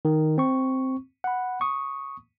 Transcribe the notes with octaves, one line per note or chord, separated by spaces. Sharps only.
D#3
C4 C#6
F#5 B5
C#6 D#6